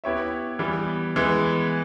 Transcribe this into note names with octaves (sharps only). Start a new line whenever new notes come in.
B3 E4 G4 C#5 E5
E3 G3 B3
E3 G#3 B3